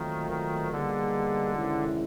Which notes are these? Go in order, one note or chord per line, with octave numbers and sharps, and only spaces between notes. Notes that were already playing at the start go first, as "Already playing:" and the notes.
Already playing: A#2 D#3 F#3 A3 C4 F4
D#3
B2 D3 G3 A#3 D#4 G#4
C3 D#3 G#3 C#4 E4